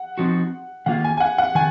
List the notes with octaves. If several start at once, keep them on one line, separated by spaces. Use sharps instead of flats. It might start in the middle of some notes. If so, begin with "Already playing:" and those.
Already playing: F#5
F3 C4 D#4 F#4
D#3 A#3 F4 F#5
G#5
G#5
F#5
F#5
D#3 G#5